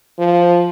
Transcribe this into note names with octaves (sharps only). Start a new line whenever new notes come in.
F3